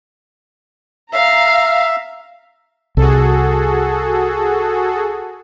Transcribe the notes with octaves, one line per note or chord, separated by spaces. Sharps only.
E5 F5 A#5
C2 F#4 G#4 A4